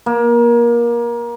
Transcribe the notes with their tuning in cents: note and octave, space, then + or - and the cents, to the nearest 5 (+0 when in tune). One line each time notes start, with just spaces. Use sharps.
A#3 +25